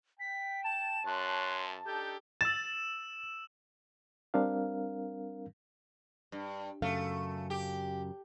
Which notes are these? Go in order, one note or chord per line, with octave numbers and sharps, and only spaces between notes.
G5 B6
A5 E7
F#2 C#5 C6 F#6
D4 D#4 G4 A4 G6
E6 A6 E7
G3 C4 D4 A#4 F5
G2
F#2 C#3 A3 F5
G4